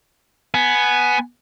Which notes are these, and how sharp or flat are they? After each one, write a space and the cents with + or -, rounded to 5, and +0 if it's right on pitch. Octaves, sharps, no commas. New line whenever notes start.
B3 +0 G#5 +15